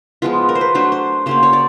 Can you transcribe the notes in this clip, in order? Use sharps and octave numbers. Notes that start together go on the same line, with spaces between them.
F3 G#3 B3 F4
A#4
C5
B4
F#3 A3 D4 C5
C5
C#3 F#3 A#3 C5
C#5
D5